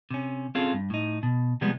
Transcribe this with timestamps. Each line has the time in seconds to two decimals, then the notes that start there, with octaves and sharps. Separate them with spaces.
0.11 C3 C#4
0.55 C4 C#4 F4 G#4 A4
0.73 G2
0.90 A2 D#4
1.23 B2
1.61 C3 F3 G3 G#3 B3